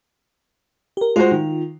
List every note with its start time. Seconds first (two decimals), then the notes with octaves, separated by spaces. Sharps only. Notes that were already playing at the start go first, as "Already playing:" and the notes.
0.97 G4 A#4
1.16 G#3 F4 F#4 C5
1.31 D#3